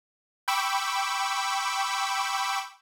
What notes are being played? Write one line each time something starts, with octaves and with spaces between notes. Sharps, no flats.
G5 B5 C#6 D6 E6